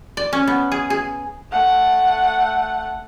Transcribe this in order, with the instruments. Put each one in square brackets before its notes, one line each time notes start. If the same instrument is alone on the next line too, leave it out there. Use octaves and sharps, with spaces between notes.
[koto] D5
C#4
B3
G#4
G#4
[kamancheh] A3 F#5